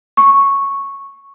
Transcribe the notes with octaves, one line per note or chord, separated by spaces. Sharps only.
C#6